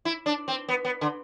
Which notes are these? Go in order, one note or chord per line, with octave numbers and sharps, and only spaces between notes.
E4
D4
C4
B3
B3
D3